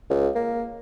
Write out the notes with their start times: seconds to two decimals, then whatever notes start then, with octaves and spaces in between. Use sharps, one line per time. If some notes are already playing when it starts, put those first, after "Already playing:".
0.10 C#2
0.35 A#3